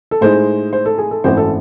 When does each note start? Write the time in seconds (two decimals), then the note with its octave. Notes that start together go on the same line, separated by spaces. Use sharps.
0.11 A4
0.21 A2 G#3 D#4 C5
0.73 C5
0.86 A4
0.98 G#4
1.11 A4
1.24 G#1 F#2 E3 A3 C4 C5
1.37 A4